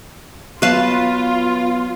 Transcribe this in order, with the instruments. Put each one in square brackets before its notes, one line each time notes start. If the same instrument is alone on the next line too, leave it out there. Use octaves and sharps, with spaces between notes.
[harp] F#3 [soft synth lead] B3 [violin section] F4 [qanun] B4 F5 A5